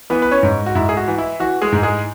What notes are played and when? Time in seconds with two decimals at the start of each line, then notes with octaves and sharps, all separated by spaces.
0.10 E3 B3 B4
0.22 B4
0.31 C#4 C#5
0.43 G#2
0.66 F#4
0.75 G#2 E4
0.89 G#4
0.97 F#4
1.08 E3
1.18 E4
1.40 E3 F#4
1.62 G#3 G#4
1.72 G#2
1.83 G#3 G#4